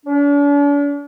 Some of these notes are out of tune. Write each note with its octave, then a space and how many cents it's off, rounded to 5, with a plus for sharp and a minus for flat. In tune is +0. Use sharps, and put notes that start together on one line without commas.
D4 -45